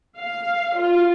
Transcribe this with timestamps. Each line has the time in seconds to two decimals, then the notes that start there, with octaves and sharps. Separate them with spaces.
0.19 F5
0.78 F4